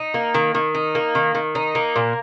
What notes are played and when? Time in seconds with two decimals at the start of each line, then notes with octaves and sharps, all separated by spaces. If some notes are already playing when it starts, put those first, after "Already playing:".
Already playing: D#4
0.14 A#3
0.34 D#3
0.55 D#3
0.75 D#4
0.95 A#3
1.15 D#3
1.35 D#3
1.55 D#4
1.75 A#3
1.96 A#2